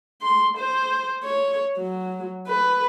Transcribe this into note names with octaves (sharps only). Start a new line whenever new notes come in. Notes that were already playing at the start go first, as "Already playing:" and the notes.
C6
C5
C#5
F#3
B4